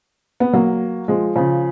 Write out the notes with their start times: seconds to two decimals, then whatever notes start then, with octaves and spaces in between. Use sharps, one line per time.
0.40 B3
0.53 F#3 A#3
1.08 F3 G#3
1.36 C#3 F3